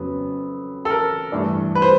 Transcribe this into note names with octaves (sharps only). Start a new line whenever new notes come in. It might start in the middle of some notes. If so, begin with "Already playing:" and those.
Already playing: F2 C#3 F#3 B3
A4
A#4
G2 E3 A3 D4
B4
C5